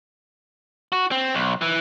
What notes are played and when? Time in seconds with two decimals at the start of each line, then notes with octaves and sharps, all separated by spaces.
0.92 F#4
1.11 C4
1.35 B1
1.62 E3